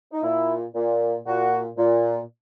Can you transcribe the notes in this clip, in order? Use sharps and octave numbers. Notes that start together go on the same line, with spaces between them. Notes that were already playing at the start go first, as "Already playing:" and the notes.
D#4
A#2 E4
A#2
A#2 F#4
A#2